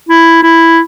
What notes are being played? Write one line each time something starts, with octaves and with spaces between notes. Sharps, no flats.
E4
E4